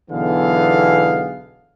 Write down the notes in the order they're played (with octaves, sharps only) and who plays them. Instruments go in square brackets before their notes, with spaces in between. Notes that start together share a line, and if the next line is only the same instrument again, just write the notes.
[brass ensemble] B1 D3 E3 B3 G#4 F5